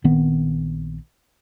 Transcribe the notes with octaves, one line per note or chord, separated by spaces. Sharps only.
A#1 D#3 B3 C4